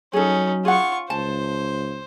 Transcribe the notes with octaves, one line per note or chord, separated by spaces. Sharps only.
F#3 C#4 D#4 G#4 A4
F4 G#4 F#5 C#6
C#2 C5 A5